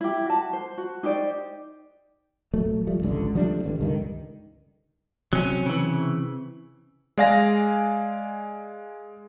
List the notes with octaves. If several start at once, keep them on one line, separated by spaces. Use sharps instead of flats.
E4 G4
F#4 A5
C5
F#4
D#4 G4 C5 D5
D#1 F#3 A3
F3 G3 A3
G#1 C#2 D3
F3 G3 A3 D4
A1 G2 D3
C#2 G2 D3 D#3
C3 F#3 C4 C#4
C#3 E3
G#3 D5 F5 G#5 A#6